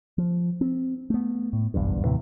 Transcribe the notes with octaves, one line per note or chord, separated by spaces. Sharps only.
F3
C4
A3 B3
A2
F#1 B1 E2 G2
D#2 A2 C3 E3